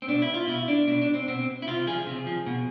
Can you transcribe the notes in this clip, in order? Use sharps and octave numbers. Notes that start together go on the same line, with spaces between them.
C4
B2 D4
E4
F4
B2 E4
D4
B2 D4
D4
C4
B2 C4
E4
C3 F4
F3 G#4
C3
F3
B2